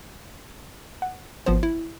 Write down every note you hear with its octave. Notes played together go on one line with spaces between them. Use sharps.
F#5
G#1 F3 B3 C5
E4